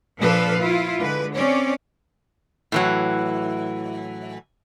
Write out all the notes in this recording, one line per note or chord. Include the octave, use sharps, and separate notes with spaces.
A#2 F3 D4 A4 B4 F5
E4 F4
D3 G#3 B4
C4 C#4 C#5 D5
A2 E3 F#3